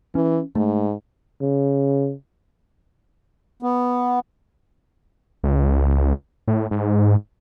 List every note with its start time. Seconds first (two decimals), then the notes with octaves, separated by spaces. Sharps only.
0.15 E3 C#4
0.56 G#2 A3
1.41 C#3
3.62 B3
5.44 C#2
6.48 A2
6.71 G#2